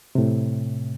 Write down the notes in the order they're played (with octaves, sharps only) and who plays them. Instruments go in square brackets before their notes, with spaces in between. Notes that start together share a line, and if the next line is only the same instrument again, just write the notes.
[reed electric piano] A2 C3